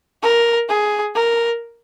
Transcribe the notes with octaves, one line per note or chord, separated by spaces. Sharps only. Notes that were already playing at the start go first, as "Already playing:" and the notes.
A#4
G#4
A#4